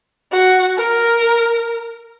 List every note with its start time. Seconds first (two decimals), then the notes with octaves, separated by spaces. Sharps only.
0.32 F#4
0.77 A#4